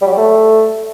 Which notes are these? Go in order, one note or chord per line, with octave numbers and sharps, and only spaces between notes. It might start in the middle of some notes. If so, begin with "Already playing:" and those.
G3
F#3
G3
A3